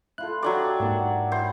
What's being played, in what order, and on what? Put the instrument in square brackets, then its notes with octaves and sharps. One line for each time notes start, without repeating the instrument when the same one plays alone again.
[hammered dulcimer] E4 F4 A4 [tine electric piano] F#6
[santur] F#3 D4 D5 [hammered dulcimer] G4
[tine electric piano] G#2 A#3 [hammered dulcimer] F#5 A5
[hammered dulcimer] E4 G5 [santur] C5